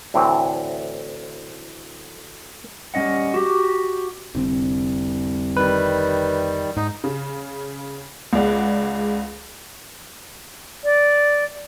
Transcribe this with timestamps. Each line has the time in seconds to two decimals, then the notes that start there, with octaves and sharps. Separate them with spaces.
0.14 D2 A2 E3 C4
2.94 G3 A3 C#4 D#5 F#5
3.34 F#4 G4
4.34 F1 C2 D3 C4
5.57 D#3 G3 B4
6.76 G#2 D#4
7.04 C#3
8.33 C#2 G#4 D5 F#5
10.84 D5